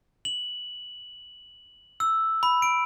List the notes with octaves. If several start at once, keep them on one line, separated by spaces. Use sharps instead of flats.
F#7
E6
B5
D7